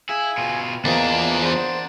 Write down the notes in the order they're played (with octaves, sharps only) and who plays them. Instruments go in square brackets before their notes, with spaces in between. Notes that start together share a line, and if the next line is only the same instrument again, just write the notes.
[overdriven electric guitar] E4 [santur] G#4 E5 F5 [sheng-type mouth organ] G#5
[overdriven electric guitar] B2 F4 [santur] G5
[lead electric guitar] E2 G#4 [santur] F3 A#4 D#5 [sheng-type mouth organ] A#3 [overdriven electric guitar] D4
[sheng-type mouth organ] C5 [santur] F#5